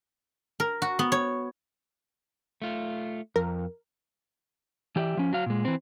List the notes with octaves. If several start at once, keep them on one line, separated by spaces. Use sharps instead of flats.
A#4
F#4
B3
C#5
A3 F4
F2 A#4
E3 G4 D5 E5
F3 C#4
F#3 F#4 F5
A#2 G#3
E3 C4